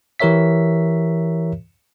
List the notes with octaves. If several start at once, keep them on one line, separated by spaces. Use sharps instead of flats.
E3 G4 A#4 C#5 E5 B6